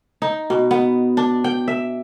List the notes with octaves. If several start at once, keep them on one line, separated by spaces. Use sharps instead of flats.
D#4
B2
B3
D4
G5
E5